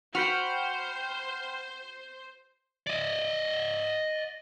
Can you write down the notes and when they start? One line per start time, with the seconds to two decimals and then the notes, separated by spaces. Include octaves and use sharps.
0.15 F#4 C5 G5 B5 F6
2.87 D5 D#5